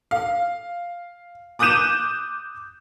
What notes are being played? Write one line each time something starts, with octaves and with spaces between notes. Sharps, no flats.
F5
D6 D#6 F#6 G6 D#7 E7